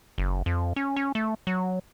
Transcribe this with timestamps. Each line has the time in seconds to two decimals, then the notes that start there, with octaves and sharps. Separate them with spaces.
0.18 F#1
0.46 F2
0.76 C#4
0.96 C#4
1.15 A3
1.47 F#3